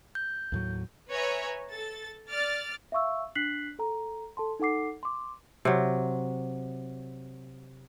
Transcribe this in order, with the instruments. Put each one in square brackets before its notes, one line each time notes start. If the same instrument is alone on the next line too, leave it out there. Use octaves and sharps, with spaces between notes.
[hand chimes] G6
[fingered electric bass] D#2 A2 F#3
[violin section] B4 C#5 E5 G#5 A#5
A4 A6
D5 F6 A6
[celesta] E5 F5 C#6 E6
D4 F#6 B6 C7 F#7
A4 A#5
A4 A5 C6
D#4 A4 F#5 D6 C7
C6 D6
[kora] C3 F#3